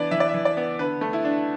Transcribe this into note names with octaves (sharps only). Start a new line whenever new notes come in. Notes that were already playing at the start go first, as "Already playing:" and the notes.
Already playing: E3 B3 D4 B4 D5
E3 E5
D5
E5
E3
D5
B3
D3 B4
A3
E4
D4